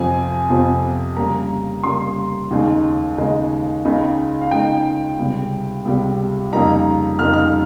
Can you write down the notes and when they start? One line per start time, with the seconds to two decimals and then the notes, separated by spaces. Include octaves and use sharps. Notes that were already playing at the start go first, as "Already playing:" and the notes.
Already playing: F2 C3 F3 C4 G#5
0.50 F2 C3 F3 C4
1.17 C#3 G3 A#3 A#5
1.83 C#3 G3 A#3 C6
2.51 D#2 C#3 G#3 D#4
3.17 D#2 C#3 G#3 D#4
3.85 C#2 C#3 G#3 D#4
4.41 F5
4.51 C#2 C#3 G#3 D#4 G5
5.19 C#2 C3 G3
5.85 C#2 C3 G3
6.52 F2 C#3 G3 A#3 D#4 A#5
7.19 F2 C#3 G3 A#3 D#4 F6
7.33 F6